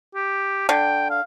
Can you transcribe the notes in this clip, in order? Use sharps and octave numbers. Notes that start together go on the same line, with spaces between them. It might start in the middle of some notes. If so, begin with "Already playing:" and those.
G4
D3 G5
F5